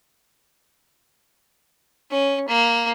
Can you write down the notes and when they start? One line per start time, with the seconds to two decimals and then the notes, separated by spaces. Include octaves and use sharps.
2.11 C#4
2.48 A#3